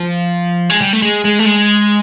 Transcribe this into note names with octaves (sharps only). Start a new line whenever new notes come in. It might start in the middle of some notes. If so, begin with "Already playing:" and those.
Already playing: F3
G#3
G3
A3
G#3
G#3
A3
G#3